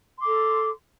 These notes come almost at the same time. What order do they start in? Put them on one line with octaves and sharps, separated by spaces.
C6 D6 A4